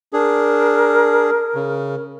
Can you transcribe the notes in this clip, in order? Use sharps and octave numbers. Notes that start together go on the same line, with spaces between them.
D4 G#4 A#4
C#3